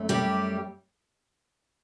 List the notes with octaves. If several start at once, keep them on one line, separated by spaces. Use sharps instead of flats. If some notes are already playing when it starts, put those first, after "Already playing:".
Already playing: F#2 A3
G3 G4